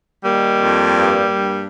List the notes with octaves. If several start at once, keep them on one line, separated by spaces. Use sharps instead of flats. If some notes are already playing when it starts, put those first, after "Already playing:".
D#3 G3 A#3
F2
G2
G2